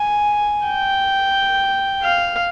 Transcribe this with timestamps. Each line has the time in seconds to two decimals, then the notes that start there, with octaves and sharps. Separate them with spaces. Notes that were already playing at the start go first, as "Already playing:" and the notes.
Already playing: G#5
0.65 G5
2.03 F5